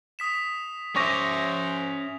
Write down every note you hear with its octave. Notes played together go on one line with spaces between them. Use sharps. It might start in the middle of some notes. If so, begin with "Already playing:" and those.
D#6 B6 E7
C#4 C5 E5 C#6 D6 A#6 F7